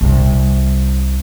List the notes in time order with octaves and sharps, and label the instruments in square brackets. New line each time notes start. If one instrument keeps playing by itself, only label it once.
[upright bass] C2 C3